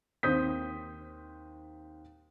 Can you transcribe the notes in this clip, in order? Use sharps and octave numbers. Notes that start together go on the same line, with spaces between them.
D#2 C4 C5 D#6 G6 B6